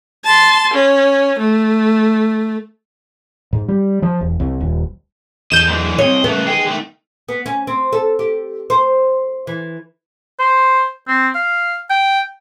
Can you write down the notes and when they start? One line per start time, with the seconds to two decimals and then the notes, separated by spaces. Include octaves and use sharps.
0.25 A5 C6
0.73 C#4
1.39 A3
3.53 G#2
3.68 G3
4.02 F3
4.21 E1
4.40 C2
4.61 D#1
5.52 E2 A4 D#5 G6 E7
5.67 G#2 D3 E3 F#3
5.99 C2 C4 C#5 D#5
6.24 C#3 A#3 B3 A4 E5
6.47 D#4 G#4 D#5 G5
6.67 D3 A3
7.29 B3
7.46 C#4
7.67 C4
7.93 A4
8.19 G4
8.70 C5
9.47 E3
10.39 C5
11.08 C4
11.35 F5
11.90 G5